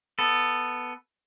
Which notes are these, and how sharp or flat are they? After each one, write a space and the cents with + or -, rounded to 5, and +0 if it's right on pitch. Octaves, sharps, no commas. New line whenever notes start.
B3 +0 A4 +0